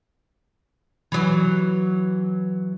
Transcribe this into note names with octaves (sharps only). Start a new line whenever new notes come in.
E3 F#3